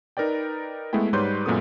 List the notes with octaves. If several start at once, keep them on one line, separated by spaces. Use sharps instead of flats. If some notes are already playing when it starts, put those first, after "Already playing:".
D#4 A#4 B4 D5 G5
G#3 A3 B3 E4 G5
G#2 G3 B4 C#5 C6 G6
F#2 A#2 G#3 B3 A4 D#6